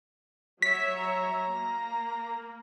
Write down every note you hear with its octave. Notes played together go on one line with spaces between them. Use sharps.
F#3 C#5 E5 B6
A#5
A#3